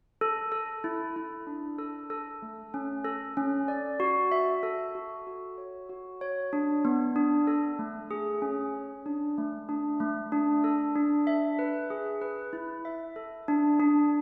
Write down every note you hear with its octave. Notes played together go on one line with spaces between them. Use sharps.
A4
A4
E4
E4
D4
A4
A4
A3
C#4
A4
C#4
D5
F#4
E5
A4
F#4
F#4
C#5
F#4
C#5
D4
B3
D4
A4
A3
G#4
C#4
C#5
D4
A3
D4
A3
D4
A4
D4
E5
B4
G#4
B4
E4
E5
A4
D4
D4